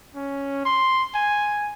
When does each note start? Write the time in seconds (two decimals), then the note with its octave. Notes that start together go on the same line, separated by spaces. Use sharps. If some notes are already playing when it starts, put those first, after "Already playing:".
0.15 C#4
0.65 C6
1.15 G#5